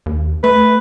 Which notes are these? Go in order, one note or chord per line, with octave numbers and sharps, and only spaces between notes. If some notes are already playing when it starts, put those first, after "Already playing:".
D#2
A3 B4